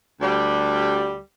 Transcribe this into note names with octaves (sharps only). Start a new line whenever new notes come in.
D2 G3